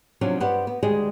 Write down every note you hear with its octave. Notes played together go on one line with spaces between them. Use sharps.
C3 F3 F#3 C#4 D4
G2 B3 G4 B4 C5 F#5
B3
D2 D#3 G3 G#3 G#4 D#5